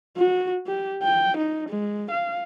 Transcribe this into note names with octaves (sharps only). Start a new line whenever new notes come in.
F#4
G4
G5
D#4
G#3
F5